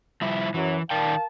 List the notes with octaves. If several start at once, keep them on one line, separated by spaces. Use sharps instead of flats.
F3 G3 E4
F#2 E3 F#3
D#3 A#4 D5 F5 G5 A5